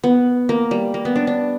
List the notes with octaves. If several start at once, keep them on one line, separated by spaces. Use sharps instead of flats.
B3
A#3
G3
A#3
B3
D4
D4